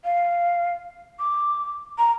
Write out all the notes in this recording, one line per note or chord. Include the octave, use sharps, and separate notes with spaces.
F5
D6
A#5